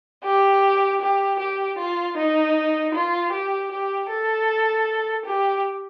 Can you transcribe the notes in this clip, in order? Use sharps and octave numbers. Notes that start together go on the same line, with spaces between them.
G4
G4
G4
F4
D#4
F4
G4
G4
A4
G4